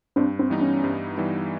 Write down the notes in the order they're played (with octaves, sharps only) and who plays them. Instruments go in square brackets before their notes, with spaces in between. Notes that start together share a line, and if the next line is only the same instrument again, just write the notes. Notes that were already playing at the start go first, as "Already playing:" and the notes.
[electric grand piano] G2 [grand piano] C4 D4
[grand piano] C4
[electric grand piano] E3 G3 B3 D#4
[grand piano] C#4
[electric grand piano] G2
E3 G3 B3 D#4